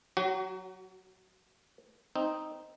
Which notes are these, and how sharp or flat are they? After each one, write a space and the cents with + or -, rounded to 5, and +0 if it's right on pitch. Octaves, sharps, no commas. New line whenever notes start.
F#3 +0 F#4 +35
C4 +0 D#4 +0